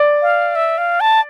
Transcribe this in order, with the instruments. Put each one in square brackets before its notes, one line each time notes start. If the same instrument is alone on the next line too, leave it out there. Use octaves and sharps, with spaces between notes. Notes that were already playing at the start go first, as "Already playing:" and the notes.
Already playing: [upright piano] D5
[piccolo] F5
E5
F5
A5